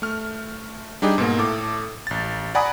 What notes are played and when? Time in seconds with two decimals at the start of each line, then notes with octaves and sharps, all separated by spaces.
0.02 A3 F6
1.02 G3 D4 D#4 G4 G#4
1.18 G#2 B2 A#3
1.38 A2 A4 D6
2.07 A1 A6
2.55 D5 F#5 G#5 A#5 B5 D#6